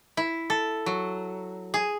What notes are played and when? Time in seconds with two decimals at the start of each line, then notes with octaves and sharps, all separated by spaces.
0.17 E4
0.50 A4
0.86 F#3
1.74 G#4